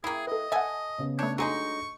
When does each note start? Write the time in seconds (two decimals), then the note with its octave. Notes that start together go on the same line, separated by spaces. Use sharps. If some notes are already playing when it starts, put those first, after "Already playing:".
0.04 A#3 E4 G#4 G5
0.27 A4 B4 D#5
0.52 A4 E5 F#5 G#5
0.98 C#3 B3
1.19 A3 D4 C#5 G6
1.38 F#3 G#3 D4 D#4 A4 C#6